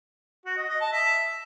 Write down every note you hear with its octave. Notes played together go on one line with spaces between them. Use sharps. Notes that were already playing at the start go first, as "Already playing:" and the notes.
F#4
D#5
D#5
A5
E5